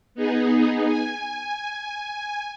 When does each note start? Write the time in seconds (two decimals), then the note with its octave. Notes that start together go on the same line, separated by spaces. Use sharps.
0.15 B3 D#4 G#4
0.84 G#5